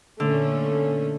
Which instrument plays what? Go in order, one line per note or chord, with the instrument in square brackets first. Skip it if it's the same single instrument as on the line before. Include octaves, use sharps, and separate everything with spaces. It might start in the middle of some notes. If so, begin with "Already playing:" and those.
[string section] A#2 A3 C#4 [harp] D3